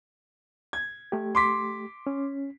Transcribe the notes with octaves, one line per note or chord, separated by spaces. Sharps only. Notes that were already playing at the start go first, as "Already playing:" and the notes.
G#6
A3 G4
C6 D6 B6
C#4